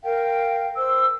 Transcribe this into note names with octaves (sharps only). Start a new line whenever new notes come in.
A#4 F5 G5
C5 E6